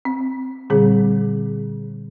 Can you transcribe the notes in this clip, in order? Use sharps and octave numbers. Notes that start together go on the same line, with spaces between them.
C4
A#2 D3 G3 C4 G#4